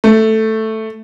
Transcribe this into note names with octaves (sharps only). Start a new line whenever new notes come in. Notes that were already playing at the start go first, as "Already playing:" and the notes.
A3